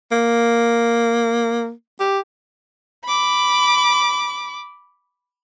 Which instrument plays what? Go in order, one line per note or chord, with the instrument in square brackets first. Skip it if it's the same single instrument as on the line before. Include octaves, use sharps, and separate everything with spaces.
[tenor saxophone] A#3
G4
[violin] B5 D6